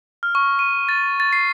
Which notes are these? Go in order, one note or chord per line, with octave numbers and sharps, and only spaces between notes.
F6
C#6
D#7
A6
A6
C7